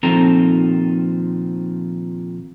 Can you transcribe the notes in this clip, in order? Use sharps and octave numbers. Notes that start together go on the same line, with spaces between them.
A#2 D#3 F3 C4 A4 A#5